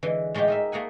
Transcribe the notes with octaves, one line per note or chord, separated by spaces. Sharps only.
D3 E3 G#3
A2 G#3 A3 F4 G4
D#4 A#4 E5
A3 A#3 G#4 F#5 G#5